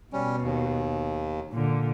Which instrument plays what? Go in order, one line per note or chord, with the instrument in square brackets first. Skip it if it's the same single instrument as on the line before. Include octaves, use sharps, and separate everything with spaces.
[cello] B2 [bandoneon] G3 C#4
[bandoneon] D#2
[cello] A#2 D3